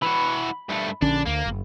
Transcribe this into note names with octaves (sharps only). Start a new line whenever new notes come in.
E3 F#4 B5
G2 A3
A#1 D3 C#4 D4
D2 A#3
F#1